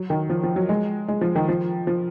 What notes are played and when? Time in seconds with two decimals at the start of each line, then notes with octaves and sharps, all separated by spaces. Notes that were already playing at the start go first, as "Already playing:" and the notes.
Already playing: F#3
0.10 D#3
0.30 F3
0.43 F3
0.56 F#3
0.69 G#3
1.08 G#3
1.21 F3
1.35 D#3
1.48 F3
1.87 F3